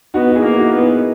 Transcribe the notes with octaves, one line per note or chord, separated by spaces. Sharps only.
B3 D#4 F#4
F#4
E4 G#4
A#3
D#4 F#4
B3
E4 G#4